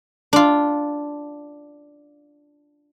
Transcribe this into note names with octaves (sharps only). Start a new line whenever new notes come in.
D4 F4